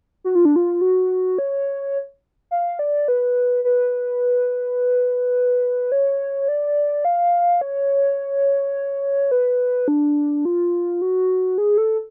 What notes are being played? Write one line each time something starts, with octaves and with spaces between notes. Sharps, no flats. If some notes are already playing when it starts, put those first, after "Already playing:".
F#4
F4
D4
F4
F#4
C#5
F5
D5
B4
B4
C#5
D5
F5
C#5
B4
D4
F4
F#4
G#4
A4